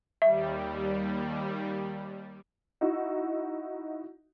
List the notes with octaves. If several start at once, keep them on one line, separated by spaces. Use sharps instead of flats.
D#2 G3 E5
D#4 E4 F#4